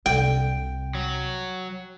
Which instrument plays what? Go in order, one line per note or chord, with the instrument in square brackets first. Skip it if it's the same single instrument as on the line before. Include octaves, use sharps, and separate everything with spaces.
[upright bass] C2 C3 [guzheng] G5
[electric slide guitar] F#3